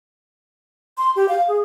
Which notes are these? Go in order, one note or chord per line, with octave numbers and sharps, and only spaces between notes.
C6
G4
F5
G#4